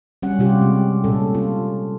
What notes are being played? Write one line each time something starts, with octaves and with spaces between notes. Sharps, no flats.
G3 C#4 F#5
C3 G3 F4 G4
G#3
A#2 C#4 A4
F4